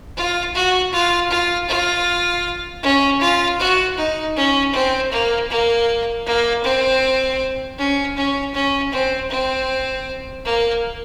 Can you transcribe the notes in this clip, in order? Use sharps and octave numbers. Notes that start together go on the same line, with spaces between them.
F4
F#4
F4
F4
F4
C#4
F4
F#4
D#4
C#4
C4
A#3
A#3
A#3
C4
C#4
C#4
C#4
C4
C4
A#3